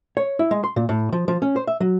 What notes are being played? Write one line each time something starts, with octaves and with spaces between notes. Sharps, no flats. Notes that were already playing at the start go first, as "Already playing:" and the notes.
C#5
E4
G#3
C6
A#2
A2
F3
F3
C#4
C5
E5
F#3